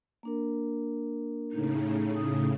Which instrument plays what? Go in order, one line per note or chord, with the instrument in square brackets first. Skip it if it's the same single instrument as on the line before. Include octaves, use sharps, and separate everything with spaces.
[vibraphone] A#3 D4 A#4
[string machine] A2 C#3 [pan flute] D#4
[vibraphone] D#6